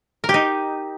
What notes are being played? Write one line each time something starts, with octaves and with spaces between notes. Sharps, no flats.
A#4
G4
D#4